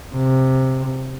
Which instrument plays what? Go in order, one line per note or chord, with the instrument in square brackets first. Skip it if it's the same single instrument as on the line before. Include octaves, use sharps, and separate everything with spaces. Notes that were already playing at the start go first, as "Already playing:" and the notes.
[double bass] C3